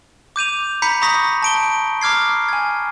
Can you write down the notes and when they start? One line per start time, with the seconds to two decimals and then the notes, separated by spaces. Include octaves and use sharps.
0.36 D6 G6 D#7 F7
0.82 A#5 B5 G6 B6 C#7
1.02 A#5 B5 C#6 D#6 A#6 B6
1.42 A5 D7 G7
2.02 A#5 D6 F6 G#6 C7
2.48 G#5 G#6